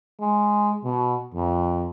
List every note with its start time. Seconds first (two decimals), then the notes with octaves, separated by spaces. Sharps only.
0.20 G#3
0.84 B2
1.34 F2